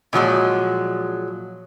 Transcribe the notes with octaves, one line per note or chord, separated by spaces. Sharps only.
A#2 F3 F#3 G#3